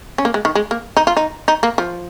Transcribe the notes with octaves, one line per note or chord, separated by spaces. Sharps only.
C#4
A#3
G#3
D#3
G#3
A#3
D#4
F4
D#4
D#4
A#3
F3